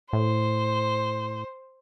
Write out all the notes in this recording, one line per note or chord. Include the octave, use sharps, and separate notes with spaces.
A2 C5